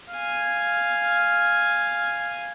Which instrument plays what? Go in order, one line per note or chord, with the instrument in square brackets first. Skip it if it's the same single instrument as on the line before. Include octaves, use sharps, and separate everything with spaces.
[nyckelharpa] F5 G#5